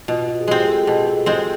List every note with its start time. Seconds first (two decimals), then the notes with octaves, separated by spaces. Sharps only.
0.08 B2 F4
0.29 F#4
0.41 G#4
0.48 G#3 C4 G4
0.68 A4
0.87 B2 G#4
1.07 A4
1.26 G#3 C4 G#4